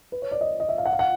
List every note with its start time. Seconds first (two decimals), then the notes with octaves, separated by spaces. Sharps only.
0.12 B4
0.22 C#5
0.31 D5
0.41 D#5
0.60 D#5
0.69 E5
0.78 F5
0.86 F#5
0.93 F5
0.99 F#5